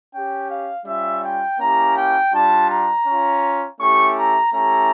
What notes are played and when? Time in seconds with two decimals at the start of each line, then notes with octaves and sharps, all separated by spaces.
0.13 C#4 G4 G5
0.50 F5
0.86 G3 C#4 F4 E5
1.24 G5
1.60 A#3 C#4 E4 G4 A#5
1.96 G5
2.33 G3 D4 F4 A5
2.70 A#5
3.07 C#4 F4
3.80 A3 C#4 E4 G4 C#6
4.17 A#5
4.53 A3 C#4 E4 G4 A#5